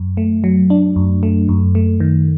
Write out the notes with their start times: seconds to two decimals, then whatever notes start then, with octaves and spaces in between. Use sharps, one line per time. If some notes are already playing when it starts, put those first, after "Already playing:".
Already playing: F#2
0.17 A3
0.44 F#3
0.70 D4
0.96 F#2
1.23 A3
1.49 F#2
1.75 A3
2.00 D#3